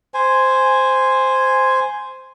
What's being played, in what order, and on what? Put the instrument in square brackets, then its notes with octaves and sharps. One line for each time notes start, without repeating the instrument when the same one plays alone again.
[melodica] C5 G#5